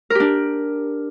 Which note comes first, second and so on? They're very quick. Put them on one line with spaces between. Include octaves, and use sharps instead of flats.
A#4 G4 D4